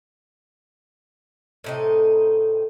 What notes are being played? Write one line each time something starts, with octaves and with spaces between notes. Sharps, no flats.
A2 C3 D#4